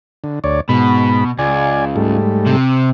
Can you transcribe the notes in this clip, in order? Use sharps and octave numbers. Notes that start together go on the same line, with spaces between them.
D3
D2 C#5 D5
G#2 B2 B5
C#2 D5 G#5
G#2 G3 A3
C3